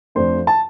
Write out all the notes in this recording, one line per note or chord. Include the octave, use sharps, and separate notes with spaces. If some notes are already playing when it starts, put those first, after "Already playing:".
F2 F3 A3 D4 C5
A5